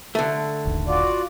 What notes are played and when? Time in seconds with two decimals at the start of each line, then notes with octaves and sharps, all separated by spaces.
0.15 D3 A3
0.65 D#1 G#1
0.87 F4 F#4 D5